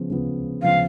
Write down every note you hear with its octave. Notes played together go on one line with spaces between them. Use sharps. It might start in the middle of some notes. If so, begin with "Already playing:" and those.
Already playing: C#3 F3 B3
C#3 F3 B3
C#3 F3 B3 F5